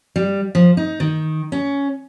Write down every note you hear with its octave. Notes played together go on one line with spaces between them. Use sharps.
G3
F3
D#4
D#3
C#4